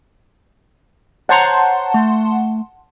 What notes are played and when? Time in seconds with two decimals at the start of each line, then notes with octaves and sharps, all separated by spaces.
1.29 C5 C#5 F#5 A5 A#5 C6
1.94 A3